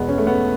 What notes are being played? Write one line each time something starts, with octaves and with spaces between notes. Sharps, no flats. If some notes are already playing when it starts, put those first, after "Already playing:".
Already playing: E2 B2 G#3 B3
C#4
A3
B3